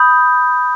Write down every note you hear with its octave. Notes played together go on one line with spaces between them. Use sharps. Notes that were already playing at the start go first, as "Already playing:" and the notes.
Already playing: B5 D#6 G6